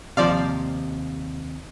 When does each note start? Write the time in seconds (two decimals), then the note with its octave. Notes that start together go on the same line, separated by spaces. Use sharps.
0.17 D#2 C3 F3 D5 F5